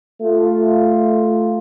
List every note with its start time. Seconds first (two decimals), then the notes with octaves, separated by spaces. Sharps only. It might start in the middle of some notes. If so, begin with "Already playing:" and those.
0.21 A3 F4